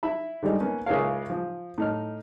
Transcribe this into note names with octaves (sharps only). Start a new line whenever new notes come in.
E4 E5 B5
D3 G3 G#3 D#4
A#3 B3 C#4
C#2 C#3 E4 A#4 C#5 F5
F3
A2 D#4 F6